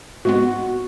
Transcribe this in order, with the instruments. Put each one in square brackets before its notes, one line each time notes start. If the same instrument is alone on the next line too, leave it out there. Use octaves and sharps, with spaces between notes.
[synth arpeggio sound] G#2 G#3 B3 [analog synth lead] F#4